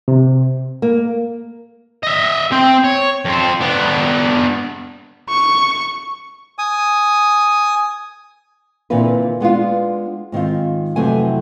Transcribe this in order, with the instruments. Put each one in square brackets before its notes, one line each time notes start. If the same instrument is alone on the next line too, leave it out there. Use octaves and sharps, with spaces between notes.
[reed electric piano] C3
[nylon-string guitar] A#3
[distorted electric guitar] D#5 E5
C4 G5
C#5
F2 C4
B3 D4
[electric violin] C#6
[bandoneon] G#5 D#6
[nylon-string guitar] A#2 D3 E3 C4 F4 B4
G#3 B3 D4 F4
G#2 D#3 C4 F4
F2 C3 E3 F#3 A3 G#5